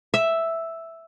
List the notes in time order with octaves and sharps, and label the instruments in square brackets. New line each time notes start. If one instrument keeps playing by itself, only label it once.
[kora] E5